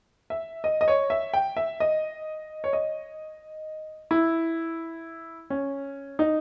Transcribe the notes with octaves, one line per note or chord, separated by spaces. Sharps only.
E5
D#5
D#5
C#5
E5
G5
E5
D#5
C#5
D#5
E4
C#4
D#4